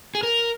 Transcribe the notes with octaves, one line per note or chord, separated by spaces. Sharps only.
G#4
A#4